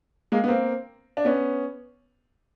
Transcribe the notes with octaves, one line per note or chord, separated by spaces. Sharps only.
G#3 A#3
B3
A#3 C4
D4
B3 C#4